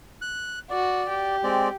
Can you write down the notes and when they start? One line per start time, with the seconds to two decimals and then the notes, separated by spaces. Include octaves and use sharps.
0.22 F#6
0.70 F#4 D5
1.09 G4
1.43 G#3 C4 D5